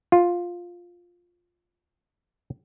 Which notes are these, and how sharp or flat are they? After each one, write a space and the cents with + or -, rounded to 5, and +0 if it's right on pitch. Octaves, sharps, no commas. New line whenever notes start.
F4 +5